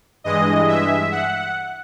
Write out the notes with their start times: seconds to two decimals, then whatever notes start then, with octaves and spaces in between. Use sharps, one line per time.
0.24 G2 E3 G#3 D#5
0.68 E5
1.11 F#5